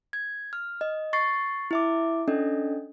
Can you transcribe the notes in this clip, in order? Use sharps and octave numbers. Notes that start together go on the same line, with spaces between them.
G#6
F6
D#5
C#6 A6 C7
E4 E5 D6
C#4 D4 A4 D#5